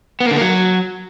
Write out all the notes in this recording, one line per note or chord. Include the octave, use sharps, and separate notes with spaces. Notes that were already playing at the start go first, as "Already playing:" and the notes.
B3
A#3
D3
A#3
F#3